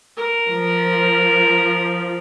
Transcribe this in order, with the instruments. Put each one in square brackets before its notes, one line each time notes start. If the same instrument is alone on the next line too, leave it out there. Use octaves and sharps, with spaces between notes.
[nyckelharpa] A#4
[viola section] F3